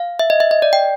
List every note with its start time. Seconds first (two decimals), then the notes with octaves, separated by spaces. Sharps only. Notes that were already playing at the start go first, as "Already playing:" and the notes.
Already playing: F5
0.19 E5
0.30 D#5
0.40 E5
0.51 D#5
0.62 D5
0.73 G5